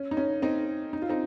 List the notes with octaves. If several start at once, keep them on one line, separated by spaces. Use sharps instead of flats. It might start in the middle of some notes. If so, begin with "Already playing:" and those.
Already playing: C#4
D#4
C#4
C4 D#4
D#4
F4
C4 D#4